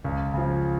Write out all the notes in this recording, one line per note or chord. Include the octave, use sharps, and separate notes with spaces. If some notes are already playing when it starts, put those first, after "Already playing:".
C#2
C#3 F3